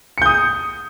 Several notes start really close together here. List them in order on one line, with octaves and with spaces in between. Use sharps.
C#7 G6 D#6